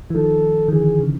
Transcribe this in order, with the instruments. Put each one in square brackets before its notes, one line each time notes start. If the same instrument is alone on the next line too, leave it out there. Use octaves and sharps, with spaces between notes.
[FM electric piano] E3
[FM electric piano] D#3 F3 [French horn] A4
[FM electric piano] D#3
[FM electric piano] D3 E3 [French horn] G#4
[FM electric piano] C#3